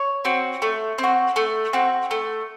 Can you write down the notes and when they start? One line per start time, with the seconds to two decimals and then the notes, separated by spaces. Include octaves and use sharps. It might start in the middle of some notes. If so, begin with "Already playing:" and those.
Already playing: C#5
0.25 C4 F#4
0.62 A3
0.98 C4
1.03 F#4
1.36 A3
1.73 C4 F#4
2.11 A3